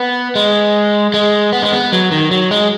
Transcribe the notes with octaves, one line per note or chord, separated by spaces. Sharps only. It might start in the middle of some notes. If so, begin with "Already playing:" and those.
Already playing: B3
G#3
G#3
B3
G#3
B3
F#3
D#3
F#3
G#3